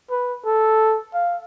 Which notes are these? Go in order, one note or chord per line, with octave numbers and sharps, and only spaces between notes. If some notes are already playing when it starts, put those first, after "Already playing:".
B4
A4
F5